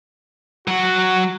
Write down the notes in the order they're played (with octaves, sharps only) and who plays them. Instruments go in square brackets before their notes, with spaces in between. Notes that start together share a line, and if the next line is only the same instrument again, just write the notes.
[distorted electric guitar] F#3 F#5 [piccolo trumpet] F#4